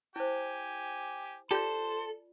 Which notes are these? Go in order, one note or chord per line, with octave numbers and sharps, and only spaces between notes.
E4 G4 C5 G#5
F4 G4 A4 C5 D5 G6